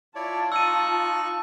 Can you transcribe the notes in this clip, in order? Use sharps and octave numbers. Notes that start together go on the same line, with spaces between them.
E4 F4 C#5 D5 A5
D#4 C#6 E6 F#6 D#7